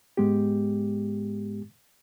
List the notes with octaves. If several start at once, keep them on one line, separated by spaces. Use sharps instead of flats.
G#2 G#3 B3 G4